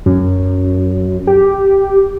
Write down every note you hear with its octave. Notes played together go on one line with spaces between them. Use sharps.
F#2
G4